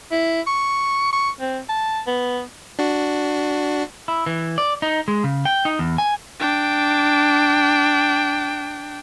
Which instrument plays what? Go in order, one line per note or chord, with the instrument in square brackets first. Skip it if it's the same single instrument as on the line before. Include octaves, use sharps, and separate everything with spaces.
[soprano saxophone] E4
C#6
C#6
C4
A5
B3
[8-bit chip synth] D4 F#4
[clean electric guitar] E4
E3
D5
D#4
G#3
C#3
G5
D#4
E2
G#5
[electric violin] D4 G5